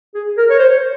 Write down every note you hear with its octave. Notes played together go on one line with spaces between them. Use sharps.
G#4
A#4
C#5
C5